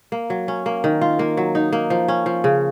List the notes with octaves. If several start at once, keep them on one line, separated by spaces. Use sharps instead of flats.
A#3
F#3
C#4
A#3
D#3
F4
A#3
F#3
D#4
A#3
F3
C#4
F3
C#3